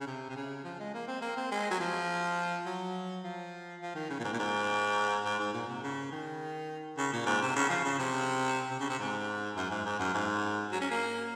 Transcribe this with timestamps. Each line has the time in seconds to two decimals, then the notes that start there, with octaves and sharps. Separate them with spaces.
0.01 C#3
0.06 C3
0.29 C3
0.36 C#3
0.64 F3
0.80 G#3
0.94 A#3
1.08 C4
1.22 A#3
1.37 C4
1.51 G#3
1.71 F#3
1.80 F3
2.66 F#3
3.23 F3
3.81 F3
3.95 D#3
4.10 C#3
4.19 A#2
4.24 G#2
4.33 A#2
4.39 G#2
5.25 G#2
5.39 G#2
5.53 A#2
5.68 C3
5.83 C#3
6.11 D#3
6.98 C#3
7.13 A#2
7.26 G#2
7.41 C3
7.55 C#3
7.69 F3
7.84 C#3
7.99 C3
8.71 C3
8.80 C#3
8.89 C3
8.99 G#2
9.56 F#2
9.70 G#2
9.86 G#2
9.99 F#2
10.14 G#2
10.72 F#3
10.81 C#4
10.91 A#3